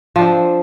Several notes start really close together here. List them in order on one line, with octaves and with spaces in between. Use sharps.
F3 D4 C4